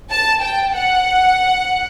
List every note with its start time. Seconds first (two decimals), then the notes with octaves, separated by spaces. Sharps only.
0.10 A5
0.42 G5
0.74 F#5